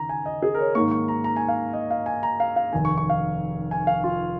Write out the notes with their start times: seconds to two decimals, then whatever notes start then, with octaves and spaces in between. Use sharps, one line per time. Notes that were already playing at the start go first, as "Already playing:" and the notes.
Already playing: D#2 C#3 A#5
0.09 G#5
0.26 D#5
0.43 G#4
0.55 A#4
0.59 C#5
0.75 G#2 D#3 A#3 C#6
0.91 C#6
1.08 A#5
1.24 A#5
1.36 G#5
1.49 F5
1.73 D#5
1.91 F5
2.06 G#5
2.23 A#5
2.40 F5
2.56 F5
2.73 F1 D#2 D#3 G#5
2.85 C#6
2.98 C#6
3.10 F5
3.71 G#5
3.87 F5
4.04 F4